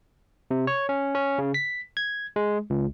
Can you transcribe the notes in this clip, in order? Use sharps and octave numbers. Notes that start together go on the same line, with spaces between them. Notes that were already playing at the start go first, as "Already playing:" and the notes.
C3
C#5
C#4
C#4
C#3
B6
G#6
G#3
C#2